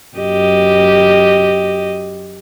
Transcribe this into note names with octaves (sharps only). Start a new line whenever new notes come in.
F#2 G4 D#5